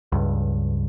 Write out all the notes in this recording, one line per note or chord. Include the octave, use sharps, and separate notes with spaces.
C#2 G2